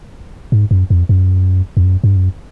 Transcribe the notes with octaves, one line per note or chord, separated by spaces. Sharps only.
G#2
F#2
F2
F#2
F2
F#2
G2
F#2